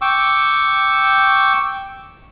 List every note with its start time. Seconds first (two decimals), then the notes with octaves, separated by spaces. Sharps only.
0.02 G5 C#6 D6 E6